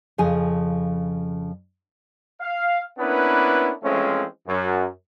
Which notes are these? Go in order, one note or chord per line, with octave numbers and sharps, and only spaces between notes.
F2 C#3 F3 G#4 G#5
F5
A#3 B3 C#4 D4 E4 B4
E3 F3 G#3 A3 C4 C#4
F#2